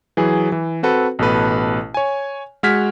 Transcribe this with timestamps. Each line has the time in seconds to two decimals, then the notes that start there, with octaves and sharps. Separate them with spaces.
0.17 E3 F#3 G#4
0.52 E3
0.83 C4 F#4 A4 B4
1.19 A1 B2 A4 B4
1.94 C#5 G#5
2.63 G#3 F#4 F6 G#6 B6